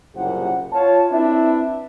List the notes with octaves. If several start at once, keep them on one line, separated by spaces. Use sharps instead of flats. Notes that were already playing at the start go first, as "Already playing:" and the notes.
F#1 C2 A#2 G4 C5 F#5
F4 C#5 A5
C4 D4 E4 B4 E5